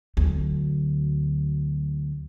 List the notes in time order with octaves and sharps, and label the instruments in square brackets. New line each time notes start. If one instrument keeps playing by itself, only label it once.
[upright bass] D2 F#3